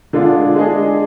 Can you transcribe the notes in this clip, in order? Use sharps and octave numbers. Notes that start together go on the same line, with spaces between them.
D3 G#3 D4 F4
G#3 D4 G#4 D#5